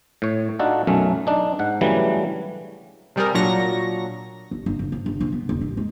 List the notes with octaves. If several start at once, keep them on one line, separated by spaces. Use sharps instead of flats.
A2 C#5
D4 D#4 F4 F#4 A4
B1 F#2 A3 C#4
D4 D#4
G#2 F#5
C#3 E3 F#3 G3 A3 D4
C3 G3 G#4 A#4
A#2 F#3 D4 A#5 C#6 A#6
A1
G1
F#1
C3
G1
C3
B3
E1
A1
G#3